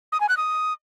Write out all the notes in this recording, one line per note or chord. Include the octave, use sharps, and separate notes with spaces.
D#6
G#5
F#6
D#6